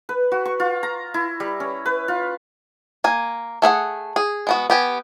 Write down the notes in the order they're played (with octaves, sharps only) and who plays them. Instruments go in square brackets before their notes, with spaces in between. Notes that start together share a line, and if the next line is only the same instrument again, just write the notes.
[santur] B4
F#4
C#6
F4
A#5
E4
G3
C#4
B4
F4
[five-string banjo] A#3 G#5
A3 G#4 B4 F#5
G#4
G#3 B3 F#4
B3 G4 G#5